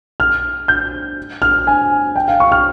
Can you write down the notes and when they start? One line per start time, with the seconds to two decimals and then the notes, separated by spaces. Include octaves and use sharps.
0.20 F6
0.68 G6
1.42 F6
1.67 G#5
2.16 G5
2.28 F5
2.40 C#6
2.52 F6